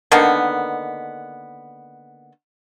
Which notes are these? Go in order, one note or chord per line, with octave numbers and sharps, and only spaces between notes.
D3 D#3 A#3 B3